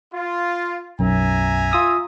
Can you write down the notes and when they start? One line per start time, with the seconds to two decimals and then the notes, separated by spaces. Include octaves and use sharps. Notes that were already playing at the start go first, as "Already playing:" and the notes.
0.13 F4
0.99 B1 F#2 E5 G#5 A#5
1.72 F4 D#6 E6